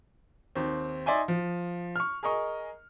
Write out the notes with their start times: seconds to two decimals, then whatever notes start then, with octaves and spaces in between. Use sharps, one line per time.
0.55 D#2 C4
1.06 D#4 D5 E5 G#5 C6
1.28 F3
1.96 C#6 F6
2.23 G#4 A#4 D#5 C#6